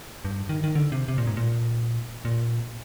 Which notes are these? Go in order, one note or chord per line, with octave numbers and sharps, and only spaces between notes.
G2
D#3
D#3
D3
C3
C3
A#2
G#2
A#2
A#2